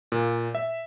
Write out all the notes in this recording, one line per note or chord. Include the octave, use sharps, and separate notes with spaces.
A#2
E5